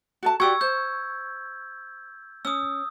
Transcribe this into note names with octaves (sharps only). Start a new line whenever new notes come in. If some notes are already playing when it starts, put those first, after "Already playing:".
F#4 A4 A5
F#4 G4 D5 C#6 E6 G#6
C5 G6
C#4 D#6 E6